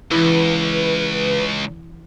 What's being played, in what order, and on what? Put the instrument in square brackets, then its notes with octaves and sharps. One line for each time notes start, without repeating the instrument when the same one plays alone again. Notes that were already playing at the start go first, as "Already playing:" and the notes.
[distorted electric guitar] C#2 [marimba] E3 E4 [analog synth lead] B4